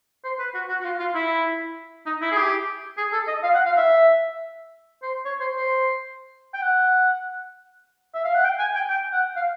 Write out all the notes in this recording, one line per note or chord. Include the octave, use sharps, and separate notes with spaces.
C5
B4
F#4
F#4
F#4
F4
F4
E4
D#4
E4
G#4
G4
G#4
A4
D#5
F5
F#5
F5
E5
C5
C#5
C5
C5
G5
F#5
E5
F5
F#5
G5
G#5
G5
G5
F#5
F5